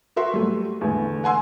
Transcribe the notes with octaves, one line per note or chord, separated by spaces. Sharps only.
F#4 A#4 E5 C6
F#3 G3 A3
E2 A2 D3
F#5 G#5 C6 E6